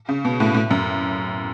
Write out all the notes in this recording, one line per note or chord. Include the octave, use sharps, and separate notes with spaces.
C#3
B2
A2
A2
F#2